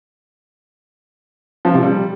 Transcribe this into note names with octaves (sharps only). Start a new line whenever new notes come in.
F3
C3
G3